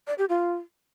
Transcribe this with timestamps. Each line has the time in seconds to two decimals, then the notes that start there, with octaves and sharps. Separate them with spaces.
0.07 D5
0.18 G4
0.29 F4